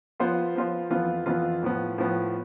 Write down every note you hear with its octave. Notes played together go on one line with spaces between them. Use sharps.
F3 B3 F4 C5
F3 B3 F4 C5
F2 E3 B3 F4
F2 E3 B3 F4
A2 F3 B3
A2 F3 B3